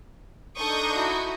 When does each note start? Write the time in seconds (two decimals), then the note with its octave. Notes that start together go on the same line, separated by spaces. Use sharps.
0.58 D4 D#4 A4 C#6 D#6 G6
0.92 E4 F#4